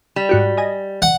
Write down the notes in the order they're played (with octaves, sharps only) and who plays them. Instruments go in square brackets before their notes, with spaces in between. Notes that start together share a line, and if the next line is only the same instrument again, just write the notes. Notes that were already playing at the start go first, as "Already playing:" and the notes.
[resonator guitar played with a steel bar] G3 [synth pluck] E7
[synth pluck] G#2 F#4 G4
D#5 G#5 A#6
[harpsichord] F#5